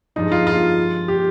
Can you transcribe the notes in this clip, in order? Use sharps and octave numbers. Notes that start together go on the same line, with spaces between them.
G2 F3 G#3 D4 D#4
F4
F4
G4